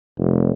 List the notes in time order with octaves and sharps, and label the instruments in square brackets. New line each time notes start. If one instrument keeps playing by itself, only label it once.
[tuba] F1